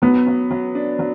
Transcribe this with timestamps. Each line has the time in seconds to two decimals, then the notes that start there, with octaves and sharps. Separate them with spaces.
0.02 F#3 B3
0.27 F#3
0.51 F#3
0.75 D4
0.99 F#3